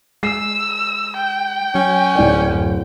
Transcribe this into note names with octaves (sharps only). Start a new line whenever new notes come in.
G#3 E6 C7
G5
F#3 C#4
D1 D5
F#2